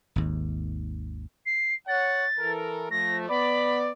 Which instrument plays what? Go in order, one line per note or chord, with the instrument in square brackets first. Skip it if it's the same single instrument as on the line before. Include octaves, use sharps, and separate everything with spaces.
[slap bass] G#1 D#2
[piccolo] C7
[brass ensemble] C#5 F#5 [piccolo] A6
[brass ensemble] E3 A4 A#4
[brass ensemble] F3 A3 [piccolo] A#6
[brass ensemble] B3 D5 [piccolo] B5